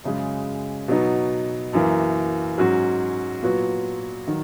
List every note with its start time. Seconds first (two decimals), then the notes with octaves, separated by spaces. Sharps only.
0.04 F#2 C#3 G#3
0.88 B2 F#3 B3 D#4
1.73 F#2 E3 A#3
2.58 G#2 F#3 C#4 F#4
3.42 A#2 F#3 B3 F#4
4.27 D#3 F#3